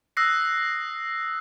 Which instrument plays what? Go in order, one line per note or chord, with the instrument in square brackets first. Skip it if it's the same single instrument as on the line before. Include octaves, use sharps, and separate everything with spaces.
[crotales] D#6 E6 F#6 A#6 C7